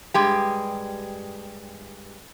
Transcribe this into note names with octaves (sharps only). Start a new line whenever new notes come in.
G2 G#3 G4